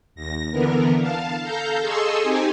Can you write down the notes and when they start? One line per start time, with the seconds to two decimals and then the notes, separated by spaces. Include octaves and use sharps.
0.15 D#2 A#6
0.51 D3 E3 B3 A#4
0.99 F5 A5
1.42 A4 F5 A#5 G6
1.81 G#4 A4 D#5 C6 C#6 E6
2.20 C4 D#4 G4 G#5